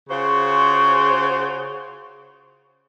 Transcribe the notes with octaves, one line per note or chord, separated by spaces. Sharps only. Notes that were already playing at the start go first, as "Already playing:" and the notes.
C#3 F4 F#4 G#4 C5